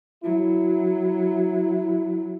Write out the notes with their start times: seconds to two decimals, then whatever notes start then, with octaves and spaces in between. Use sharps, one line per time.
0.24 F#3 E4